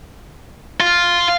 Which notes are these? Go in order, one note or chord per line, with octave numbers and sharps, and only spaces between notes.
F4